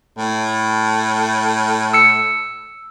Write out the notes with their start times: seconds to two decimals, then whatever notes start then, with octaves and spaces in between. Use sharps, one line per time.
0.18 A2
1.93 E6 C#7